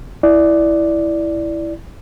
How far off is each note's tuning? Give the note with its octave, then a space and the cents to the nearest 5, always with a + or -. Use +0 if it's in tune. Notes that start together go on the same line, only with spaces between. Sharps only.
E4 +0 D5 +0